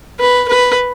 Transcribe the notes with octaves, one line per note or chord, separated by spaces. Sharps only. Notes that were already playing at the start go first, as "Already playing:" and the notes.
B4
B4